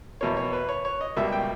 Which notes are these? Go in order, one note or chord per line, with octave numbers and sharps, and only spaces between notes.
E2 B2 A#3 C#5
C#5
B4
C#5
C#5
D#5
C#2 B2 G3 A#3 E5
G5